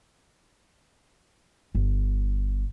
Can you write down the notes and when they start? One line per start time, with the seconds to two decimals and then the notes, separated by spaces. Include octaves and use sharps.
1.75 G1